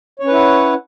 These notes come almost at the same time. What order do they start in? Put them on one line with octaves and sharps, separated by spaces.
C#5 C#4 B4 E4 F#5